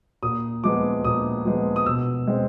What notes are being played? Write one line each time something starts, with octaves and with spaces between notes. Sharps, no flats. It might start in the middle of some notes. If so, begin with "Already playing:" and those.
A#2 D#6
F3 G#3 B3 D6
A#2 D#6
F3 G#3 B3
D#6
B2 E6
G#3 C4